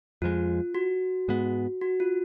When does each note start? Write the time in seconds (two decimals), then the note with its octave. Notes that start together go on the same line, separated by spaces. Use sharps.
0.22 F2 F3 G#3 F4
0.75 F#4
1.28 G#2 G#3 B3
1.81 F#4
2.00 F4